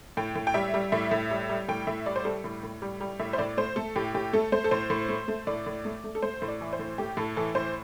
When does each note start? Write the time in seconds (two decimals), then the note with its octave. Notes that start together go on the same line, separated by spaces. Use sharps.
0.17 A2 G5
0.36 A2
0.47 G5
0.54 G3 E5
0.74 G3
0.92 A2 E5
1.11 A2
1.31 G3
1.49 G3
1.69 A2 G5
1.87 A2 E5
2.06 G3 D5
2.16 C5
2.25 G3 A4
2.44 A2
2.63 A2
2.82 G3
3.01 G3
3.20 A2 E5
3.33 C5
3.38 A2 D5
3.57 A3 C5
3.76 A3 A4
3.96 A2 G4
4.15 A2 G4
4.33 A3 A4
4.52 A3 C5
4.64 A4
4.71 A2 C5
4.90 A2
5.09 A3
5.28 A3
5.47 A2 D5
5.66 A2
5.85 A3
6.04 A3
6.15 A4
6.22 A3 C5
6.42 A2
6.48 D5
6.61 E3
6.73 C5
6.79 A2
6.98 A3 G4
7.17 A2 A4
7.36 E3 A4
7.55 A2 C5